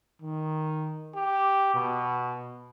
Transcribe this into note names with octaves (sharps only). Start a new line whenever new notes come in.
D#3
G4
B2